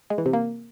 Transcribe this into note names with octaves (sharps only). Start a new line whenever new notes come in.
G#3
E3
C3
A#3